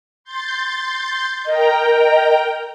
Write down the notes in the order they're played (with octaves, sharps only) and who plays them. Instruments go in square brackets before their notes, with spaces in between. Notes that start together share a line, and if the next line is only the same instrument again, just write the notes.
[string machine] C6 G6 A6
[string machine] A#4 G5 A#5 [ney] D#5